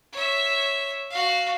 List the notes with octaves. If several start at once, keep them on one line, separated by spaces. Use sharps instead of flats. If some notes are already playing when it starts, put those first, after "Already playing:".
C#5 E5
F#4 F5